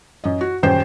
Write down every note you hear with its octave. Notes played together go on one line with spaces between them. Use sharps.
F#2 D#5
F#4
D#1 F#2 C5 G5